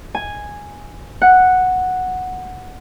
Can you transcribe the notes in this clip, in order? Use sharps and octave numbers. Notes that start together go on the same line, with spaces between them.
G#5
F#5